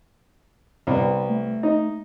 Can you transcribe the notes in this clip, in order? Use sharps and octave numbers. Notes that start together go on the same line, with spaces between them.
C2 B3
A3
D#4